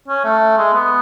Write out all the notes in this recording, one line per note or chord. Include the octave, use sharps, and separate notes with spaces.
C#4
A3
G#3
B3